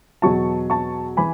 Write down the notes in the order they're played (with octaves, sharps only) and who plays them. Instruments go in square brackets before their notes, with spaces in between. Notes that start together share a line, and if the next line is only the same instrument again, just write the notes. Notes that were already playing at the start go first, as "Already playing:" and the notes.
[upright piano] E2 B2 F#3 A5 C#6
A5 C#6
E3 G#5 B5